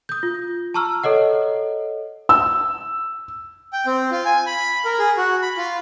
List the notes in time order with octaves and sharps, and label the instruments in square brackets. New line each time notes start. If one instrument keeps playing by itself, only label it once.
[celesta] D#6 G6
F4
A5 A#5 C#6 E6 F6
A4 C#5 D#5 F#5
[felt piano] E6
[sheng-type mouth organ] G5
C4
F4
G#5
B5
A#4
G#4
F#4
B5
F4